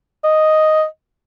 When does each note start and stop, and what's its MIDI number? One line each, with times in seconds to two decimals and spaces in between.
0.24 0.84 75